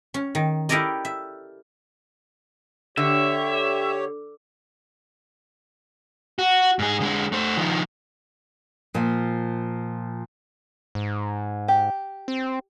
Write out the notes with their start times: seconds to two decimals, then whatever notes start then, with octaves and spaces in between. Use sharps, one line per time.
0.14 C#4
0.35 D#3
0.69 E4 G4 A4 A#4 D5 D#5
1.05 E5
2.97 D3 G4 C#5 E5
6.39 F#4
6.79 G#2 G#4
7.00 D3 G#3
7.32 A3 C5
7.57 D#3 F3
8.94 A#2 F3
10.95 G#2
11.68 G4
12.28 C4